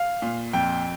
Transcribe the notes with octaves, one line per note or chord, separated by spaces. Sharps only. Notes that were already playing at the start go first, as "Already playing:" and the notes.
Already playing: F5
A#2
F2 G5